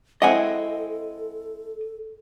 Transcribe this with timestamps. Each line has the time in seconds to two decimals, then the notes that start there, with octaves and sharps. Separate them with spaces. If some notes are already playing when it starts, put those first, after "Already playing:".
0.22 G#3 C4 E4 A4 D#5 F#5 G#5